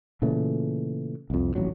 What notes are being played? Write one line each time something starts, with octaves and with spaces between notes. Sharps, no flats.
A#2 C#3 E3 A3
C2 F2
D#1 A1 F#3